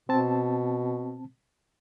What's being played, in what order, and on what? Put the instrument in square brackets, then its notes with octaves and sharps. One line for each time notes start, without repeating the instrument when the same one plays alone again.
[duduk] B2 [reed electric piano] C4 A5